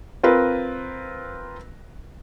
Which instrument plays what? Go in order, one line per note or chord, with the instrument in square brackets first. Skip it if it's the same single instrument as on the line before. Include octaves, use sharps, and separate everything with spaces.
[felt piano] C4 F4 A#4 B4